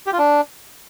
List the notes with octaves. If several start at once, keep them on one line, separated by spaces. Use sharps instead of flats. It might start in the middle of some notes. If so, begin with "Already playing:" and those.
G4
F4
D4